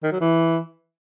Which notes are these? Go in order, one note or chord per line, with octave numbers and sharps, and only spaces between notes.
D#3
F#3
E3